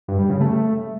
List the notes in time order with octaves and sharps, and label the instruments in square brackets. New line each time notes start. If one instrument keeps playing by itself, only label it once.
[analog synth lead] G2
G3
C#3
A3